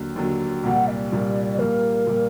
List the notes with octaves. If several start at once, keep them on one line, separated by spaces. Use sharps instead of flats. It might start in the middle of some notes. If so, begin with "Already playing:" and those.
Already playing: D#2 D3 F#3
D#2 D3 F#3
C2 A#2 G3 F#5
D5
C2 A#2 G3
A#2 G3 A#3 A#4
A#2 G3 A#3